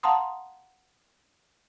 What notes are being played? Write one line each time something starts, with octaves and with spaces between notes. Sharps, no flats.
F5 F#5 A5 A#5 C6 D#6